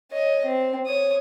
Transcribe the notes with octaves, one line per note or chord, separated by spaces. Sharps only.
C#5 D#5
C4
C#5 D#6